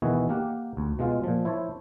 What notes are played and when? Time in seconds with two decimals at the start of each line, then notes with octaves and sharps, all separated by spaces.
0.02 B2 D#3 E3 E4 F#4 G#4
0.29 A#3 G4 A#4 F#5 G5
0.77 D2
0.99 B2 G#3 F4 F5
1.24 A#2 F3
1.45 E4 C5 C#5 A5